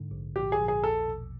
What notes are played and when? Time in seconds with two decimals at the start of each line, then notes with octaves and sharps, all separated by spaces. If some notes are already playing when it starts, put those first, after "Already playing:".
Already playing: G#2 D3
0.11 A#1
0.36 A#1 G4
0.52 G#4
0.60 A#1
0.68 G#4
0.84 E2 A4
1.08 B2